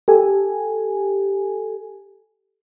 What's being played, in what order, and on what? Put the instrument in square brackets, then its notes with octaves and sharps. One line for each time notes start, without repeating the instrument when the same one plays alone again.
[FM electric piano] G4 A4 G#5